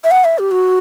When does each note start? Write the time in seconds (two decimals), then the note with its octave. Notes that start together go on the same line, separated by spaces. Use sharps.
0.04 E5
0.11 F#5
0.25 E5
0.39 G4
0.51 F#4